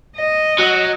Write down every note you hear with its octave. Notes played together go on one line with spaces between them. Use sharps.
D#5
F#3